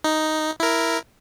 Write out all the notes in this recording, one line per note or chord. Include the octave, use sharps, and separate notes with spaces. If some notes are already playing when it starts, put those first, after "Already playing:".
D#4
E4 A#4